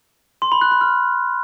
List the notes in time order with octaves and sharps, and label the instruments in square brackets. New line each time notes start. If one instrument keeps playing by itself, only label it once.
[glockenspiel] C6
B5
F#6
B5
F6